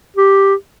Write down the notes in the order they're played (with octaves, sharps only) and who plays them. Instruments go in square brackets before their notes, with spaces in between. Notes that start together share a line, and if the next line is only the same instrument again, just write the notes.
[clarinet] G4